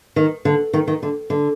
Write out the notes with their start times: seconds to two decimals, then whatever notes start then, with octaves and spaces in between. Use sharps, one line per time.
0.16 D#3
0.45 D3
0.73 D#3
0.88 D#3
1.03 D3
1.30 D3